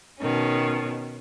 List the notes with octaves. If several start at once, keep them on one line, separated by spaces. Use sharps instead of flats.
B2 D#3 C#4